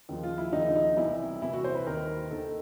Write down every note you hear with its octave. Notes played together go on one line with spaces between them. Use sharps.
D#2 C#3 F3
F4
E4
D#2 C#3 F3 D#4
D#4
C2 C3 E3 E4
C2 C3 E3 E4
F#4
C5
B4
D#2 D#3 A#4
D#2 D#3 A4